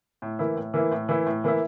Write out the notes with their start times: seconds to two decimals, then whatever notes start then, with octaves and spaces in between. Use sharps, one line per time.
0.22 A2
0.39 E3 A#3 E4
0.56 A2
0.74 E3 A#3 E4
0.91 A2
1.09 E3 A#3 E4
1.26 A2
1.44 E3 A#3 E4